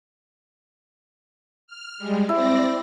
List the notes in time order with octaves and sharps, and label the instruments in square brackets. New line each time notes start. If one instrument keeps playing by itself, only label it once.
[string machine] F6
G3 G#3
[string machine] C4 D5 A#6 [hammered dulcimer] E4